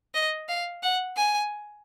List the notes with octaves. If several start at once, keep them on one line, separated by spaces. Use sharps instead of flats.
D#5
F5
F#5
G#5